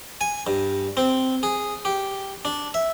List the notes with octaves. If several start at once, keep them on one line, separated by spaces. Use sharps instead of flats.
G#5
G2
C4
G#4
G4
D4
E5